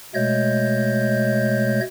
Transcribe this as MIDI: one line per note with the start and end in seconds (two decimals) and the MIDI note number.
0.15 1.81 47
0.15 1.81 56
0.15 1.81 57
0.15 1.81 73
0.15 1.81 75
0.15 1.81 91